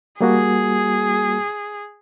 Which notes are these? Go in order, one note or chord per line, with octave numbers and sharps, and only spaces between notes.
G3 A#3 F#4 G#4